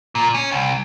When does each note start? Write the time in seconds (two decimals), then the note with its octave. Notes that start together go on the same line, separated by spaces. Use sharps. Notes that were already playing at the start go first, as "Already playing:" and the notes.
0.15 A#2
0.34 C#4
0.51 C2